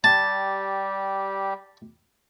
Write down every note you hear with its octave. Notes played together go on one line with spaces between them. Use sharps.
G3 G4 A5